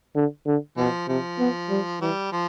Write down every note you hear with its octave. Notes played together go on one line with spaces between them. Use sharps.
D3
D3
B2 F3
C3 F3
B3
G3
E3 G3
F3